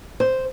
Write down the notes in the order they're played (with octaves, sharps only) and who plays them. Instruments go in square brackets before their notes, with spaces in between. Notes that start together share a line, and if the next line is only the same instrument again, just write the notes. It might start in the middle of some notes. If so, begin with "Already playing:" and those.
[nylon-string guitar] C5